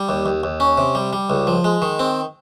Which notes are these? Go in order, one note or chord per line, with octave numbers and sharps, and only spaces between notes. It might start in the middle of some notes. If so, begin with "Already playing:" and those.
Already playing: G3
D#2
D#2
D#2
C#4
C3
G3
G3
C#2
F3
G#3
D#3
C4